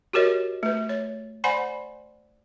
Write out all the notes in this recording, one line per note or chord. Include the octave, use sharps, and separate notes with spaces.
F#4 G4 A#4 C#5 D#5
A3 B4
C#5
C5 D5 F#5 G#5 B5 C6